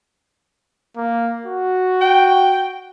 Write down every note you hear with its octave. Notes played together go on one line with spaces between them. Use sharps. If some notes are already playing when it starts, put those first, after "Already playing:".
A#3
F#4
G5